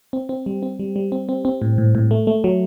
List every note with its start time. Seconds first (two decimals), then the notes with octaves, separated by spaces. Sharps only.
0.13 C4
0.29 C4
0.46 G3
0.63 C4
0.79 G3
0.96 G3
1.12 C4
1.29 C4
1.45 C4
1.62 A2
1.78 A2
1.95 A2
2.11 A3
2.27 A3
2.44 F#3